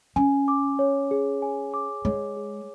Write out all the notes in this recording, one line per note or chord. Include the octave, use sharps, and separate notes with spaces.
C#4 G#5
D6
C#5
G#4
G#5
D6
G#3 C#5
G#4